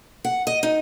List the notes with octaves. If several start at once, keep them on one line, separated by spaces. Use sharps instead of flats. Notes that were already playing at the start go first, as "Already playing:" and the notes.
F#5
D#5
D#4